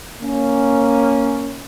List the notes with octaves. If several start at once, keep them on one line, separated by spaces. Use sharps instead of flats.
A#3 C#4